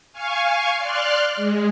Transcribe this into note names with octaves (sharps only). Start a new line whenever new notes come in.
F5 G#5 C#6
D5 C6 F6 F#6
G#3